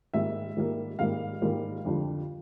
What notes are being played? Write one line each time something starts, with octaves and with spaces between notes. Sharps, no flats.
G#2 D#3 G3 A#3 E5
G#2 D#3 G3 A#3
G#2 D#3 G3 A#3 F5
G#2 D#3 G3 A#3
F2 D3 G3